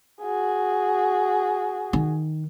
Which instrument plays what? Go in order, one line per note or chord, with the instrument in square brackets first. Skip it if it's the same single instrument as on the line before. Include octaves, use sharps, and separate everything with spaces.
[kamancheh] F#4 G#4
[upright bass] D#3